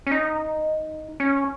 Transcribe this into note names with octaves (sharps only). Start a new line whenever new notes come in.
C#4
D#4
C#4